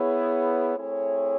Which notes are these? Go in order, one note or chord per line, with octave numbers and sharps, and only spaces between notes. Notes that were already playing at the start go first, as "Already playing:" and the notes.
Already playing: B3 E4 G#4 C#5
A3 C4 E4 G#4 C#5